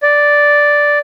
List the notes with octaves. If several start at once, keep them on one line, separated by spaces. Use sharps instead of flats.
D5